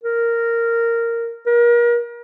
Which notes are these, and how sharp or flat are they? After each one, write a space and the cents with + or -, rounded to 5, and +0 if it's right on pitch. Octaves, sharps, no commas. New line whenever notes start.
A#4 -10
A#4 +35